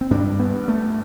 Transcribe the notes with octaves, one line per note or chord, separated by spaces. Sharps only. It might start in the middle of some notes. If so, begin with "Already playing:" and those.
C4
G2 D4
B3
G2
A3